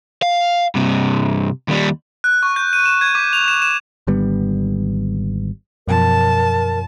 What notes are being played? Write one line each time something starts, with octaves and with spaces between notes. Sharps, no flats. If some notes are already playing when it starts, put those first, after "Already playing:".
F5
G2 C3
D#2 G3
F#6
C#6
G6
D#7
E7
G#6
D6
F7
E7
E7
G#1 D3 G3 B3
F#2 B2 F3 A#4 A5